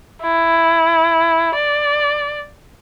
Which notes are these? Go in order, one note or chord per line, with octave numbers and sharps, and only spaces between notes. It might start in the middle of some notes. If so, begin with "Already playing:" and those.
E4
D5